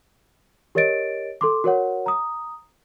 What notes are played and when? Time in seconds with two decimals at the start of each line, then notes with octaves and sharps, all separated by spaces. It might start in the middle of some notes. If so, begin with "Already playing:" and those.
0.75 G4 A#4 C#5 D#5 A6 D7
1.41 A4 C6 D6
1.64 F#4 A#4 C#5 F#5
2.06 A#5 D#6